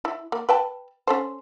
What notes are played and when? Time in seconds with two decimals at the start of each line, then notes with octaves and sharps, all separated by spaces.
0.05 E4
0.32 A#3
0.49 B4 G5 A5
1.07 C#4 A4 C5